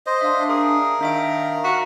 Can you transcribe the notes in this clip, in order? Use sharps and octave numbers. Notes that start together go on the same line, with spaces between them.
C5 D#5
D4 E5 F5
G#4 A#4
D#3 D4 E5 F5 D7
F#4 A#5 B6